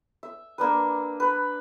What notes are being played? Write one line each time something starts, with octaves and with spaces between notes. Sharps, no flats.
E5
A#3 D4 B4
B4